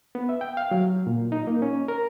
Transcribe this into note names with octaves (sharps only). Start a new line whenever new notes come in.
B3
E5
G5
F5
F#3
A#2
D#4
A#3
C#4
A#4